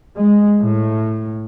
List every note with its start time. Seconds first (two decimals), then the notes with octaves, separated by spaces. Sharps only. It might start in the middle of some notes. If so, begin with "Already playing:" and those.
0.19 G#3
0.61 A2